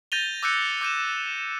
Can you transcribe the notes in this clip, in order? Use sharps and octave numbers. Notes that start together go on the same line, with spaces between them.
G6 A6 A#6 D#7 F7 G7
D6 E6 F#6 G6 C#7 D#7
D6 G6 D#7 E7